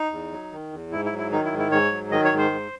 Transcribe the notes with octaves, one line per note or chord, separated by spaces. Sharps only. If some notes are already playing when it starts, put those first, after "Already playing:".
Already playing: D#4
E2
F#3
D#3
E2
G#2 E4
E4
F#3
E4
D#3 D#4
E4
G#2
E4
G#2 C#5
F#3
D#3 D#5
C#5
G#2
C5
G#2